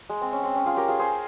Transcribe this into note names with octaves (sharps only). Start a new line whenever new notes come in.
G#3
C4
C#4
C4
C#4
F4 G#4
G4 A#4
F4 G#4
G#4 C5